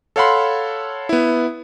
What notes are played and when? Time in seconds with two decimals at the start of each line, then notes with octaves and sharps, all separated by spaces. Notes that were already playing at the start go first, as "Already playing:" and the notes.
0.16 A4 C#5 F5 F#5 B5 C6
1.09 B3 E4